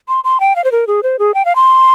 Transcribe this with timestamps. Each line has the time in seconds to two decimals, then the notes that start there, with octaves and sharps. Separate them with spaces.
0.08 C6
0.24 C6
0.40 G5
0.56 F5
0.64 C5
0.72 A#4
0.87 G#4
1.03 C5
1.19 G#4
1.34 G5
1.45 F5
1.55 C6